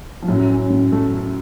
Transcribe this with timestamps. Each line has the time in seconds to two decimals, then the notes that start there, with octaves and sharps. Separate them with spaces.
0.22 F3
0.28 F#2 A2 F#3
0.50 C#4
0.70 A2
0.92 A3
1.14 A3